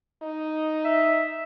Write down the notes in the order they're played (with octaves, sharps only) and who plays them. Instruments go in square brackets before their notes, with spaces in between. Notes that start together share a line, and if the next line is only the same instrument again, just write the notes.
[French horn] D#4
[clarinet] E5